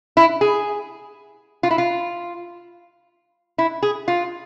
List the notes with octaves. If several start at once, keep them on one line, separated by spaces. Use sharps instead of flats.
E4
G#4
F4
E4
F4
E4
G#4
F4